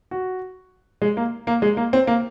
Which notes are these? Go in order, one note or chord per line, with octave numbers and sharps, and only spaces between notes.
F#4
G#3
A#3
A#3
G#3
A#3
C4
A#3